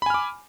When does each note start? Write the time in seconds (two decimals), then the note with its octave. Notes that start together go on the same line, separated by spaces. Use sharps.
0.02 B5
0.06 G#5
0.10 F6
0.14 D6